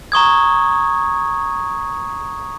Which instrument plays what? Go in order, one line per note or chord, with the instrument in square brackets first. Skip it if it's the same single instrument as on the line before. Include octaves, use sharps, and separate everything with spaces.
[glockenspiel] A#5 C#6 D#6 G#6